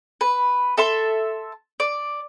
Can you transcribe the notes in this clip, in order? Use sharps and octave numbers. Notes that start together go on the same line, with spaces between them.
B4
A4 E5 C6
D5